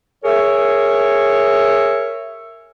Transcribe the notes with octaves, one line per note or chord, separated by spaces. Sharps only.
G#4 A#4 C#5 E5